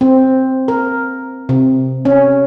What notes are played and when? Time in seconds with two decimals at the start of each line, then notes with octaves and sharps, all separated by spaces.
0.01 C4
0.68 A#4
1.49 C3
2.05 C#4